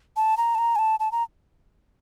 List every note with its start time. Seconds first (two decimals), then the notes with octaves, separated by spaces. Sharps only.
0.16 A5
0.37 A#5
0.55 A5
0.58 A#5
0.76 G#5
0.79 A5
1.00 A5
1.12 A#5